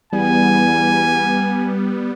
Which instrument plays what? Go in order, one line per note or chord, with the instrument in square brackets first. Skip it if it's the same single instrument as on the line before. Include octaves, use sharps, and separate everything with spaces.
[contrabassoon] E2 [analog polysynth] G3 B3 [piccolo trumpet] G#5